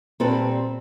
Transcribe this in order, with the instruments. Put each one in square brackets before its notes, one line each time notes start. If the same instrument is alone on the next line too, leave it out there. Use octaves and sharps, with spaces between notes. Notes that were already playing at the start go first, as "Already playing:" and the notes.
[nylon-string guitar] A#2 G3 C4 A4 B4